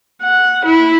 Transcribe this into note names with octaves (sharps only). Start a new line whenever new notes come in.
F#5
E4